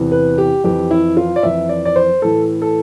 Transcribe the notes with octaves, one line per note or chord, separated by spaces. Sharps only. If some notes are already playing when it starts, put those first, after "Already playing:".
Already playing: E2 C3 E3
B4
G4
F2 E3 G4
E4
F4
D5
F2 E3 E5
D5
D5
C5
A2 E3 A4
A4